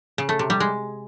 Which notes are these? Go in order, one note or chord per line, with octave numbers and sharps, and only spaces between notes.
C#3
A3
C3
G3
G#3